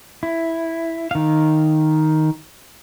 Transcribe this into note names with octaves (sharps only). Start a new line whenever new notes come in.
E4
D#3 F5